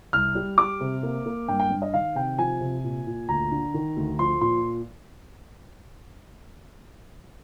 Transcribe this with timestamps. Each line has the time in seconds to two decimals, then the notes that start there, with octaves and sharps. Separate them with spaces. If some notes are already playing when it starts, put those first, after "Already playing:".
0.13 C2 F6
0.35 G3
0.58 G3 D6
0.81 C3
1.03 A#3
1.26 A#3
1.48 G2 G5
1.60 G5
1.71 G2
1.82 D#5
1.93 D#3 F5
2.15 C3 G5
2.38 F3 G#5
2.61 C3
2.84 A#2
3.07 A#2
3.29 D2 A#5
3.52 D3
3.74 D#3
3.97 D2
4.19 F3 C6
4.41 A#2 C6